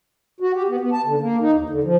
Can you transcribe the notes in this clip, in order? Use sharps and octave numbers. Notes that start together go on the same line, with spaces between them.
F#4
G4
B3
B3
A5
D3
A#3
D#4
D#2
D3
F3